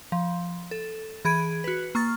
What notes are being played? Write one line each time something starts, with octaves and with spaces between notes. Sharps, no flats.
F3
A4
E3 G#4 B5 G#6 D7
F#4 B4
A#3 C#6 F6 A6